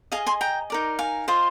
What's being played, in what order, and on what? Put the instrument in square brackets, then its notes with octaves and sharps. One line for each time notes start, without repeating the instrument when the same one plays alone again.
[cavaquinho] G#4 D#5 F5 G#5
G#5 C6
G5 A#5
D#4 A#4 D5
F5 G#5
F4 C5 D#5